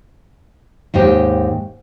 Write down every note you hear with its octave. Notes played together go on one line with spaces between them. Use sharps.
D#2 G#2 D#4 G4